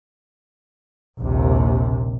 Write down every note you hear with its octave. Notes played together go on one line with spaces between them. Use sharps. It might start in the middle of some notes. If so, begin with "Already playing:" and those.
A#1 D#2 C3